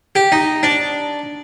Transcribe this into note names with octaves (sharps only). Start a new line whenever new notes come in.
G4
D#4
D4